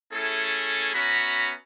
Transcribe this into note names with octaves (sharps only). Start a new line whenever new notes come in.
A3 C#4 E4 G#4 A4
B3 C#4 F#4 E5 A#5 B5